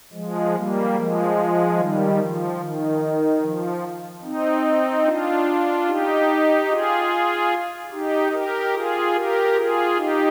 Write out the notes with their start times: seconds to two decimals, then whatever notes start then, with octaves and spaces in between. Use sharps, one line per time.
0.13 F3 G#3
0.54 G3 A#3
0.95 F3 G#3
1.77 D#3 G3
2.18 F3
2.59 D#3
3.41 F3
4.23 C4 D#4
5.05 D4 F4
5.87 D#4 G4
6.68 F4 G#4
7.91 D#4 G4
8.32 G4 A#4
8.74 F4 G#4
9.14 G4 A#4
9.55 F4 G#4
9.96 D#4 G4